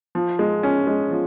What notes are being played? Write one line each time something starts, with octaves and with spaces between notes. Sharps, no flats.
F3
G#3
C#4
G#3
F3